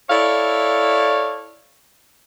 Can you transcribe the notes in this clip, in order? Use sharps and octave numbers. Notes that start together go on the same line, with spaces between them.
E4 A4 C#5 D5 F5